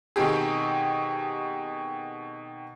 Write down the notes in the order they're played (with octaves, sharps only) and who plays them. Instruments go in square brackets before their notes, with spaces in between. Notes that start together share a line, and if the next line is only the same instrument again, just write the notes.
[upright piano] B2 D#3 C4 G4 G#4